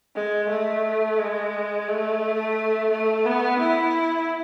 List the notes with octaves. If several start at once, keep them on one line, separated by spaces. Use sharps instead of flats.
G#3
A3
G#3
A3
A3
B3
E4